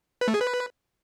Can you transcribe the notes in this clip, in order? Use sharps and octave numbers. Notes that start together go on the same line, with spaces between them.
B4
A3
G#4
B4